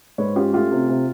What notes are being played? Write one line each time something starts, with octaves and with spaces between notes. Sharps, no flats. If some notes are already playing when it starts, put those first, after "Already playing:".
G#2 B4 C#5
C#4 F4 G4
A3 F4 G4
C3
C3